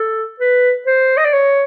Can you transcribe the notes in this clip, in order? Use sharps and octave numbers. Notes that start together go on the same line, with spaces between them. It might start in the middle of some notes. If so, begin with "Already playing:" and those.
Already playing: A4
B4
C5
D#5
D5
C#5